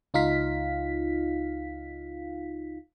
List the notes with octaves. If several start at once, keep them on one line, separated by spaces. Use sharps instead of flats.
C#2 D#4 F4 F5 B6